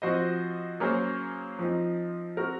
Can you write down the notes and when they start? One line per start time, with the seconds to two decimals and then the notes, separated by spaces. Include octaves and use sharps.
0.02 F3 C4 F#4 C5 D#5
0.80 F#3 A#3 C#4 G#4 C5
1.59 F3 C4 D#4
2.37 C4 F#4 A#4